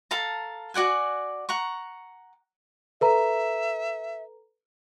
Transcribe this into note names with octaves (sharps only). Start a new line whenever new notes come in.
A4 F5 A5 A#5
F#4 D5 F#5 G#5
F#5 A#5 C#6
A4 B4 E5 A#5